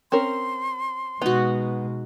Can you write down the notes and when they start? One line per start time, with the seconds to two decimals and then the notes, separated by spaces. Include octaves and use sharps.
0.12 C4 C#4 A#4 C6
1.22 B2 G#3 B3 D#4 F#4